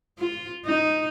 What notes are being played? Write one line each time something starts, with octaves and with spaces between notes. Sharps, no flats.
F4
D#4